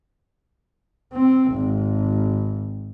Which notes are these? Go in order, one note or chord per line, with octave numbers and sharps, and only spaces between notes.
C4
G#1